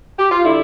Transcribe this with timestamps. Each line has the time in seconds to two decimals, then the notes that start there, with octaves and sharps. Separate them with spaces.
0.19 G4
0.31 F4
0.44 D3 G3 E4